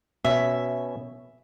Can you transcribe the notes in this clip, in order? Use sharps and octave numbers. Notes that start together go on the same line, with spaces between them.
B2 C#4 E5